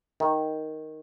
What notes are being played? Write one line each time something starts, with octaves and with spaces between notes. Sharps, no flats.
D#3